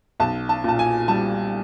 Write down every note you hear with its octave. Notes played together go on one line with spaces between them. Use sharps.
B1 A5
A5
A#2 A5
G#5
G3 A5